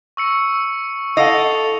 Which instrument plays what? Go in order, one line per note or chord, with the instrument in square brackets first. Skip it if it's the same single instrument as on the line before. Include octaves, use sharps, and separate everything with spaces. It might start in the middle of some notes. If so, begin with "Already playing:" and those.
[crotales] C#6 E6 C#7
[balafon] E4 F5 F#5 [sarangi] A4 [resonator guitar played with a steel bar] D#5 [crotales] E6 F7